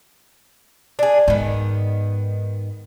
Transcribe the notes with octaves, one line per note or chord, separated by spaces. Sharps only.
D4 G#4
G#2 D#3 B3